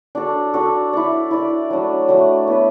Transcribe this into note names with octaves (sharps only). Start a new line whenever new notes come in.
D4 F#4 A4
D4 F#4 A4
E4 D5
E4 D5
F#3 A3 D4
F#3 A3 D4
B3 E4 B4